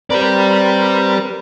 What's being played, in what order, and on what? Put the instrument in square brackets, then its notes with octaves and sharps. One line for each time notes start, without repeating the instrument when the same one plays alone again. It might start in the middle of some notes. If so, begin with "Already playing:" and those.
[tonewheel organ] C4 A#4 B4 [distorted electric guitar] G4 D5